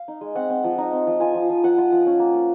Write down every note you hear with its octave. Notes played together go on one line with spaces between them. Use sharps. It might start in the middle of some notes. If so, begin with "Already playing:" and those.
Already playing: F5
D#4
G#3
C4 F#5
C4
F3
D#4
C4
F3
F4 G#5
F3
F3
F3 F#5
F4
F3
C#4
A#3
A#3